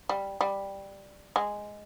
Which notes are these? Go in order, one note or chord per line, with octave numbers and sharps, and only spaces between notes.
G3
G3
G#3